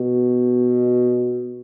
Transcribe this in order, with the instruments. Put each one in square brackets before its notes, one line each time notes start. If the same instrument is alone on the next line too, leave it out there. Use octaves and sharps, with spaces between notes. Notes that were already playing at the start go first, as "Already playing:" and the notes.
Already playing: [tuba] B2